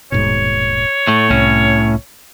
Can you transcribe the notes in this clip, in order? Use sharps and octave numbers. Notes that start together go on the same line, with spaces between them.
D#1 G#2 B2 C#5
A2 A3
C2 A2 C#4